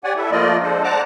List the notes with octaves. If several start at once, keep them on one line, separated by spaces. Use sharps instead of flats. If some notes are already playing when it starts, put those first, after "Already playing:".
G4 C#5 D5 F#5 G#5
E4 A4 E5
F3 A3 A#3 F4 D5 D#5
G#3 D4 A4 C5
C5 D5 F#5 A5 A#5 D6